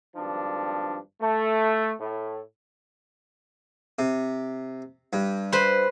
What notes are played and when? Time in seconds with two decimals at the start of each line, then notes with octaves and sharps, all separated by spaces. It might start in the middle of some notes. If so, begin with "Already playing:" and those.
0.15 G#1 G2 F3 D4
1.20 A3
1.99 A2
3.99 C3
5.13 G2
5.52 B4 C5